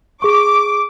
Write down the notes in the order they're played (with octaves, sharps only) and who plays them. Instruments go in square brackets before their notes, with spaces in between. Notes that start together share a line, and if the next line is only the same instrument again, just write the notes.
[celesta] G#4 C#6 [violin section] D6